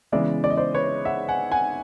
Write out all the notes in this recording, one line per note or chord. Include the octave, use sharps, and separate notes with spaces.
C#3 E3 G#3 B3 D5 E5
D5
D#5
C5 D5
B4 C#5
E5 F#5
F#5 G#5
F#5 G#5